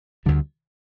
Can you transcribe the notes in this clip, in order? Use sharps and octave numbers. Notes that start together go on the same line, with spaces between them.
D2 D3 G3